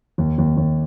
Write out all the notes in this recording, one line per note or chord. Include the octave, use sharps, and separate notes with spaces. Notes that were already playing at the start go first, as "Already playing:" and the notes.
D#2
D#2
D#2